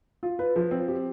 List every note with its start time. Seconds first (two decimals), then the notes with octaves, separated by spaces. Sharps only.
0.23 F4
0.39 B4
0.56 F3
0.71 C4
0.88 G4